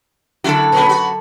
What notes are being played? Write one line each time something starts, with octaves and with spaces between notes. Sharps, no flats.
F#2 D3 E4 F#4 A4
A#2 C#3 B3
B3 F#4